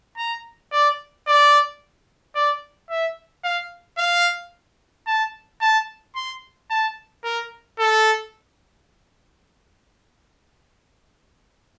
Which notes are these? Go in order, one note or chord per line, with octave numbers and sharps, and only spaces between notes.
A#5
D5
D5
D5
E5
F5
F5
A5
A5
C6
A5
A#4
A4